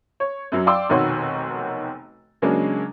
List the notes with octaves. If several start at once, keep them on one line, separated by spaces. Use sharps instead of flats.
C#5
F#2 F#3 C#4
D5 F5 G5 C6 D6 E6
F1 B1 D#3 F#4 C#5 C6
C#3 F#3 G#3 A#3 C#4 D4